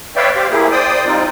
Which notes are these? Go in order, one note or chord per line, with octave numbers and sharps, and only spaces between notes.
B4 C#5 D5 E5 F5 G5
G4 C5 F5
A#3 E4 G4 G#4
C5 D5 G5 D#6
G3 C4 D#4 F4